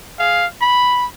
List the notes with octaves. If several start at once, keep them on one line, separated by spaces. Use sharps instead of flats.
G#4 F5
B5